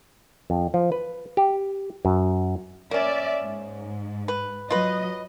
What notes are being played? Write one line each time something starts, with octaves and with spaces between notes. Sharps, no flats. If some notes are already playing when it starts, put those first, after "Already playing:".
F2
F3
B4
G4
F#2
A#3 C#4 D5 E5
G#2
B4
F#3 F4 B4 D#5